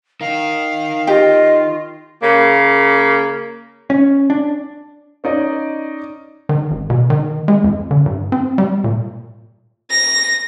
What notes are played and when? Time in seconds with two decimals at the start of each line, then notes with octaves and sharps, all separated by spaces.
0.21 D#4 A#4 F5
1.07 F4 G4 D#5 G5
2.22 C#3 A#3
3.90 C#4
4.30 D4
5.24 C#4 D#4 D5 D#5
6.49 D#3
6.71 G#1
6.90 B2
7.10 D#3
7.48 G#3
7.64 F2
7.91 D3
8.06 G2
8.32 C4
8.58 G3
8.84 A#2
9.91 A#6